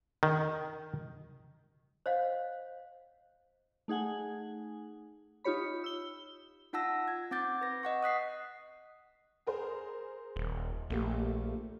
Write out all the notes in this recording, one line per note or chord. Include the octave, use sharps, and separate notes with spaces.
D#3
C5 C#5 D#5 F5 F#5
A3 D#4 G#4 F#5 G#5
D#4 F4 G4 C#5 B5
E6 G7
D#4 F4 F#5 A5 E6 A#6
G#6
C4 F#5 D6 G6 A6
B4 A#6
D#5 F#5 C#6
D#6 F#6 B6 C7
G#4 A#4 C5
D#1
A#1 A3 A#3 G4